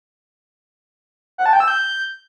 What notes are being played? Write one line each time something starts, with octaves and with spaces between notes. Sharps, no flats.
F#5
A5
G5
E6
G6